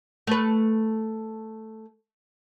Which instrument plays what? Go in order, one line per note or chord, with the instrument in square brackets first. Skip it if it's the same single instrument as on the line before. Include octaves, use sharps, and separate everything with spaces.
[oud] A3 B4